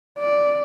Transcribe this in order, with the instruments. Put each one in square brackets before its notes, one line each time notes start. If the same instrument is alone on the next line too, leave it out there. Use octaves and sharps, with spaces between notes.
[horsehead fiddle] D5